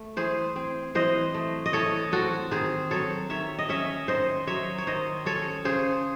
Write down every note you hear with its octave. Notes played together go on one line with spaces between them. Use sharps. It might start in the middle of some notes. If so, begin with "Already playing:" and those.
Already playing: A3
E3 G#4 C5
C4
E3 C5 D#5
A3
D#5
E3 A4 C#5
C4 F#4 A4
D#3 G#4 C5
F#3 A4 C#5
D#3 C#5 E5
D#5
C#4 C#5 E5
D#3 C5 D#5
F#3 C#5 E5
C#5
D#3 C5 D#5
C#4 A4 C#5
C#3 G#4 C5